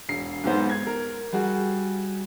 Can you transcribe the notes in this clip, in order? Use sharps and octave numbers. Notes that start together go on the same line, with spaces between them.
E1 C7
B1 G#2 B3 C5
G#6
A#4
G3 F#4 G#4